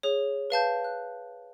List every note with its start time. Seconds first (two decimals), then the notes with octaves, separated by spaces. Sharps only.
0.03 G#4 C#5
0.50 B4 F5 A5 G6
0.84 F#6